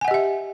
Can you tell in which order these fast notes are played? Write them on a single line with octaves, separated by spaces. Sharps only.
G#5 F#5 D#5 G4 E5